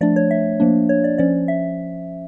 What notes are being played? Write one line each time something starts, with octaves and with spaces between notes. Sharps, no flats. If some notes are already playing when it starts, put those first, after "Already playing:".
F3 A3 D4 D5
C#5
E5
F3 A#3 D4
C#5
D5
F3 C#4 D5
E5